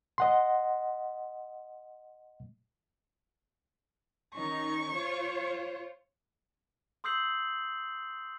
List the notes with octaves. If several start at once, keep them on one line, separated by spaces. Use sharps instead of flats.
D#5 F#5 C6
D#3 C#4 D#4 C#6
F4 C5 C#5
C6 D#6 E6 G6 C7 F#7